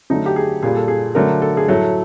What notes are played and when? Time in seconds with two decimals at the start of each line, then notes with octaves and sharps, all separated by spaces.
0.10 D3 F#3 A3 D#4
0.26 G4
0.36 G#4
0.63 A#2 G3 G#4
0.76 A4
0.88 G#4
1.15 D3 F#3 A3 A#4
1.42 A4
1.57 G#4
1.68 A2 F#3 A3 A4